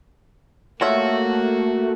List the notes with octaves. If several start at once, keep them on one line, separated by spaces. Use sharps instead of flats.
A3 A#3 F4 F#4 C#5 E5